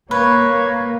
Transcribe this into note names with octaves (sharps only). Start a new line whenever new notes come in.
A#3 B4 C#5